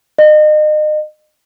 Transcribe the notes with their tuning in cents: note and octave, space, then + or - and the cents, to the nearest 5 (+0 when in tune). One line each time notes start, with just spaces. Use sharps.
D#5 -35